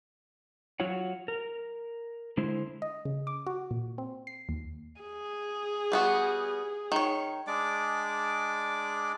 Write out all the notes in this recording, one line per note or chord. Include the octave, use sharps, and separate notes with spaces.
F#3 F4 F#4 C#5 F#5
A#4
D3 G#3 E4 C5
D#5
C#3
D6
F#4
A#2
C4
C7
D#2
G#4
G3 B3 F#4
D#3 C#5
G#3 D4 D5 D6